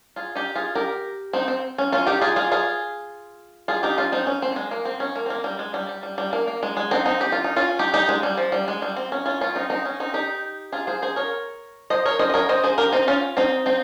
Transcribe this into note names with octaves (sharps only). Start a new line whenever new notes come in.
F4 G#4
D#4 G4
F4 G#4
G4 A#4
C4 D#4
C4
C#4
C#4 F4
D#4 G4
F4 G#4
F4 G#4
F4 G#4
F4 G#4
D#4 G4
C#4 F4
C4 D#4
C#4
C4
G3
G#3
A#3
C4
C#4
A#3
C4
A#3
G3
G#3
G3
G3
G3
G3
A#3
A#3
G#3
G#3
C4 D#4
C4 D#4
G4
F4
D#4
C#4 F4
D#4 G4
D#4 G4
G#3
G3
F3
G3
G#3
G3
C4
C#4
C#4 F4
C#4 F4
C4 D#4
C4 D#4
C#4
C4 D#4
D#4 G4
F4 G#4
G#4 C5
G#4 C5
A#4 C#5
C5 D#5
A#4 C#5
C5 D#5
D#5
A#4 C#5
C5 D#5
G#4 C5
G4 A#4
C4 D#4
C#4 F4
C4 D#4
C4 D#4